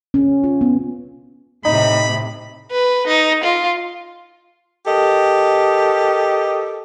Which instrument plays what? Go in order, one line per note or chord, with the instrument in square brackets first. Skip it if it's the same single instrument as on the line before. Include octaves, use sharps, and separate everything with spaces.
[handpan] C#4
F4
B3
[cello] A2 C3 [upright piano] D#4 [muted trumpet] B5
[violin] B4
D#4
F4
[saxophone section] G4 A4 A#4 D#5